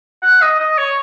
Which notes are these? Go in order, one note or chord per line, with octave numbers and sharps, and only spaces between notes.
F#5
D#5
D#5
C#5